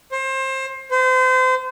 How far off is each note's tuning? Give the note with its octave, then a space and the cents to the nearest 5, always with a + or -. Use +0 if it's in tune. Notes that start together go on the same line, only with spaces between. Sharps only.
C5 +25
C5 -35